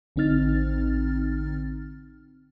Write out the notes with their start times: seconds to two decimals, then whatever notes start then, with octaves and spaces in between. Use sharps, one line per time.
0.16 A1 D3 C4 D#4 F6 A6